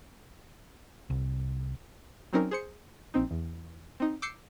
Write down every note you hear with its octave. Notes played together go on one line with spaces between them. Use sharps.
C2
F#3 C4 C#4 D#4 A#4
G#4 C5 C#7
A#1 C4 D#4
E2
C4 D#4
D6 E6 G6 C7 C#7